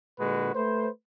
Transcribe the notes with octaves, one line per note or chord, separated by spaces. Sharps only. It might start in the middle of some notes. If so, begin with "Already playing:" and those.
A#2 D3 G#3 F#4 B4
A3 B4 C5